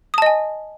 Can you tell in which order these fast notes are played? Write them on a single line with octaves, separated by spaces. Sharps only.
D#6 A5 D#5 G#5